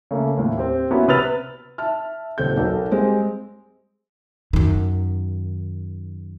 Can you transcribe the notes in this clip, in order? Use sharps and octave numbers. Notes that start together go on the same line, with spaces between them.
C#3 A3 A#3
D#2 A2
C4 G4
A#3 B3 C#4 E4 F#4
C3 B4 E6 F6 A6 F7
E5 A5 F6
D#1 C4 A4 G6
B1 A4 A#4
G3 G#3 C4 G#4
F#2 D#3